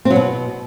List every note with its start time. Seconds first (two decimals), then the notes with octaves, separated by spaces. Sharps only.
0.05 C4
0.10 F#3
0.16 B2